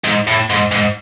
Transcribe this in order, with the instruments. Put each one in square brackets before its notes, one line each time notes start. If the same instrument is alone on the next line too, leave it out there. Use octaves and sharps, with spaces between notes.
[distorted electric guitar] G#2
A2
G#2
G#2